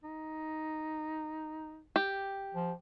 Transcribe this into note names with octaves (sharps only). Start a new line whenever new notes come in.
D#4
G4
F3